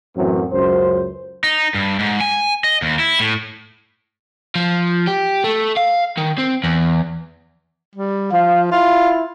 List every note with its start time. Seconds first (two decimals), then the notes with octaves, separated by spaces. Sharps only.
0.17 F#2 A2 E3 F#3 C4
0.53 C#2 F#2 C5
1.44 D#4
1.74 G2
1.99 G#2
2.21 G#5
2.64 D#5
2.82 D#2
2.99 E4
3.20 A2
4.55 F3
5.07 G4
5.44 A3
5.77 F5
6.18 D#3
6.38 C4
6.64 E2
7.95 G3
8.32 F3 F5
8.71 E4 F4